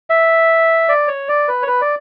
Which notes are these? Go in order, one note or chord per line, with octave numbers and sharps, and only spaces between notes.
E5
D5
C#5
D5
B4
C#5
B4
D5